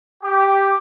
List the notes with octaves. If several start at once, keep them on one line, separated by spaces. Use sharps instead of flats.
G4